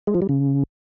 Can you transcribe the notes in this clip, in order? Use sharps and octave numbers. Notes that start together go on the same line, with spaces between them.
G#3
F3
G3
C#3